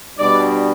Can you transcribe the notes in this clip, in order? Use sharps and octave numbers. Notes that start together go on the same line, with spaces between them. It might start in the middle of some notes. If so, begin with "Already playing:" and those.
B2 G3 D4 D5